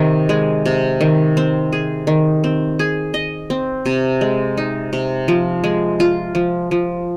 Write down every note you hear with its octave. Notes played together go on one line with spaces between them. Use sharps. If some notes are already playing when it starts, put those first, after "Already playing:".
Already playing: C3 D#3
G#3
C3
D#3
C4
G#4
D#3
C4
G#4
D#5
C4
C3
G#3
D#4
C3
F3
G#3
F4
F3
F3